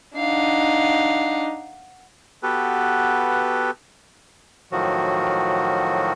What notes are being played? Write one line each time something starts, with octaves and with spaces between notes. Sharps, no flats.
D4 D#4 F5 F#5
B3 F#4 G4 A4 B4
A2 D#3 F3 F#3 F#4